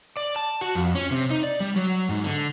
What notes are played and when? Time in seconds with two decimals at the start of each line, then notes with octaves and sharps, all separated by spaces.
0.17 D5
0.36 A5
0.61 F#4
0.75 F2
0.95 C#4
1.11 C3
1.30 D#4
1.43 D5
1.60 G3
1.76 F#3
2.09 G#2
2.24 D3